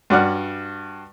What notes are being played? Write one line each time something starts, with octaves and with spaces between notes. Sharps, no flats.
G2 F#4 D5 F#5 F6